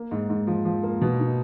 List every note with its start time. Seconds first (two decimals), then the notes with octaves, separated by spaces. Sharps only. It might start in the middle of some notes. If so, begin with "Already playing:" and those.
Already playing: A#3
0.11 G#2
0.29 G#2
0.47 F3
0.65 F3
0.83 A#3
1.01 B2
1.20 D#4